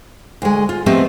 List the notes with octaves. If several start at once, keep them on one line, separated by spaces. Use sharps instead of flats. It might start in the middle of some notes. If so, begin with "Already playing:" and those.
D2 G#3
F4
F3 A3 B3 C4 G4 D#5